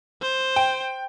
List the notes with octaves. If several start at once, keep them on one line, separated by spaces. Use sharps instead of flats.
C5
G5